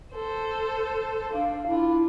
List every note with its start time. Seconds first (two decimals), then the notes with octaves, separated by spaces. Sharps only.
0.14 A4 C5
1.33 D4 F5
1.68 D4 E4 F4